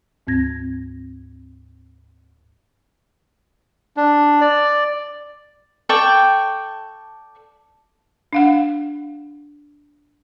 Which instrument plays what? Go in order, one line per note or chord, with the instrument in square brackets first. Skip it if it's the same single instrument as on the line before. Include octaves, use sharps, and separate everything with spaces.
[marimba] D2 G#2 C4 G#6 A#6
[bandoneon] D4
D5
[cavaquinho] A4 D5 G5 C#6
[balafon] D4 F5 F#5